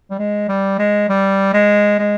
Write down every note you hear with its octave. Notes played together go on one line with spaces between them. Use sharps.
G3
G#3
G3
G#3
G3
G#3
G#3